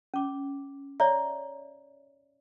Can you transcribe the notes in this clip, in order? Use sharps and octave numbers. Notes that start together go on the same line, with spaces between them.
C#4 D6
C#5 D5 E5 A#5